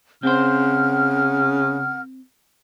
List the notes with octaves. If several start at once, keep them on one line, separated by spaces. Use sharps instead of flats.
C#3 C4 C5 F#5 F6